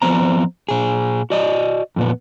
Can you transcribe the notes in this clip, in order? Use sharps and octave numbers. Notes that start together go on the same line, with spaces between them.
F3 B3 C4 A#5
A#2 G#4
F#4 D5 D#5
F2 A#2 B3